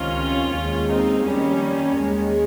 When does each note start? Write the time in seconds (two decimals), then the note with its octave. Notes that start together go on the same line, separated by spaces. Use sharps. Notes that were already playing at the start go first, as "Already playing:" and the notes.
Already playing: C#2 C3 D#3 C#4 F4
0.50 D#2 D#3 G#3
0.87 C4 D#4
1.23 F2 D#3 G3 A#3 C#4
1.97 D#2 D#3 G#3